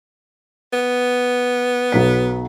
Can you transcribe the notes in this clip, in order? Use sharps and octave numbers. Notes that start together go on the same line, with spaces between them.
B3
B1 F#3 B6